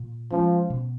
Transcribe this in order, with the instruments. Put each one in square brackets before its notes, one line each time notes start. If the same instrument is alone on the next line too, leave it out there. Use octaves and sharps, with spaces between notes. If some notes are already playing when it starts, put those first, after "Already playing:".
Already playing: [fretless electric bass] A#2
[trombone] F3 [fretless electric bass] G#3 C#4
[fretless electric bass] B2